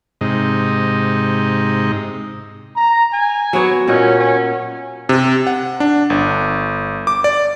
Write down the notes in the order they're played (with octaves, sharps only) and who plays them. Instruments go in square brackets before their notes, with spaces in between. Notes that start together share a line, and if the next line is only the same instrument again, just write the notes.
[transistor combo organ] G#2 C3 D#4
[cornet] A#5
G#5
[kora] F#3 B3 C#5
[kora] A#2 D#5 F#5 [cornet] C#4
[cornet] C#4
[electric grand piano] C3
F#5
D4
G1
D6
D5